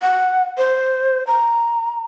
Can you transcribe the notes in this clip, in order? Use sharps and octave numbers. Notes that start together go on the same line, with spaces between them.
F#5
C5
A#5